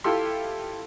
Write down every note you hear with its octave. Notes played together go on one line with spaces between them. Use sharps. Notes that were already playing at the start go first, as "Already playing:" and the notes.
E4 F4 G4 A4 C6